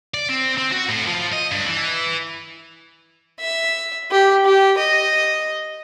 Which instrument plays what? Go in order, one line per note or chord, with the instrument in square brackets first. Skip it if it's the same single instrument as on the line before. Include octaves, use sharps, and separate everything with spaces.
[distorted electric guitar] D5
C4
C4
F#4
A2
F3
D#5
G2
E3
[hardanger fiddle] E5
G4
G4
D#5